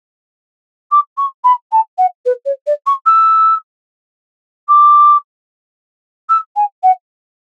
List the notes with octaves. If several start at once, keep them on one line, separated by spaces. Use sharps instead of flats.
D6
C#6
B5
A5
F#5
B4
C#5
D5
C#6
E6
D6
E6
G#5
F#5